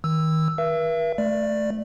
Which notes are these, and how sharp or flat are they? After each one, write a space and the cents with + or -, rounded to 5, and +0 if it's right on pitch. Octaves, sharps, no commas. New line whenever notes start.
D#3 +30 E6 +0
B4 -45 E5 +35
A3 -10 D5 +10